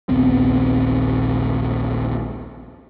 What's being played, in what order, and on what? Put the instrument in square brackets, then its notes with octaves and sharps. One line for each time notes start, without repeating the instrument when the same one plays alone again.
[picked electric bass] A#1 D#2 B3 C4